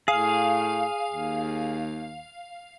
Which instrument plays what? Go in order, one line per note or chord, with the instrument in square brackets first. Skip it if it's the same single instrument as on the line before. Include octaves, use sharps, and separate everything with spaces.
[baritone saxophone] A2 [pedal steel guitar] G#4 [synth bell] F5
[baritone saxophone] D#2